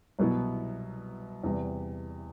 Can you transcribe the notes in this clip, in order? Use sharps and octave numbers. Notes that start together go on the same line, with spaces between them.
C2 B2 F#3 B3 E4
E2 C3 G3